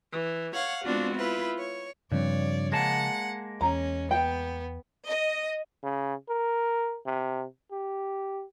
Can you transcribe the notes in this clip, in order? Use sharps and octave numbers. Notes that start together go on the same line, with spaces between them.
E3
C#5 F5 F#5
G#3 B3 C4 D4 F4 F#4
E4 F4 B4
C#5
G2 C#3 F3 C4 C#5 D5
G#3 A#3 F#5 A5
E2 C#4 A#5
B3 G5
D#5
C#3
A#4
C3
G4